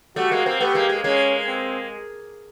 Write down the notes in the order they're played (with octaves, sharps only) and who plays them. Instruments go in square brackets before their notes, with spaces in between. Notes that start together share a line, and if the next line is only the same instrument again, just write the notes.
[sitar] G3 A3 [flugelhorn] F#4
[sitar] G#3 A#3
A#3 C4
[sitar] A3 B3 [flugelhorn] G4
[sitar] G#3 A#3
G#3 A#3
[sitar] G#3 A#3 [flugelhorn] C#4
[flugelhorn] C4